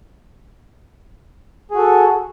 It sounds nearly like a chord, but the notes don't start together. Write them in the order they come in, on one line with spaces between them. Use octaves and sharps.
G#4 F#4 A4